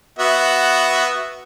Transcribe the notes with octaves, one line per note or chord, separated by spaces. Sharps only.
B3 F#4 E5